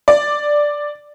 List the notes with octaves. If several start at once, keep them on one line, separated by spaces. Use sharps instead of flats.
D5